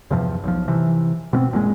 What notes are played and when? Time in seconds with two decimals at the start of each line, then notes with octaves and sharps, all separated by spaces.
0.11 E2 G2 C3 F3
0.43 B1 F3
0.68 C3 E3
1.33 B2 A#3 C4
1.52 F#1 A#2 C#3 G#3